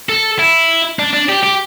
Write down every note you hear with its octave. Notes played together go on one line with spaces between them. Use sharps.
A4
E4
D4
D4
G4
G4